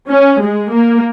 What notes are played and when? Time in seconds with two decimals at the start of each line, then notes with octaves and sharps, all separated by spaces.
0.09 C#4
0.41 G#3
0.71 A#3